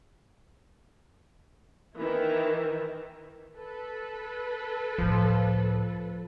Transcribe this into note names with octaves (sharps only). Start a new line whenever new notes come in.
D#3 E3 E4
A4 B4
C#2 A2 F3